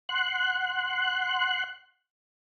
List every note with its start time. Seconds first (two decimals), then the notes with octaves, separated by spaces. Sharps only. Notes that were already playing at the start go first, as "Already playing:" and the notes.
0.09 F#5 C6 F#6